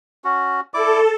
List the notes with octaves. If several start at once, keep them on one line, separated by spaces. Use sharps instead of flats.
C#4 F#4
E4 A4 D5 D6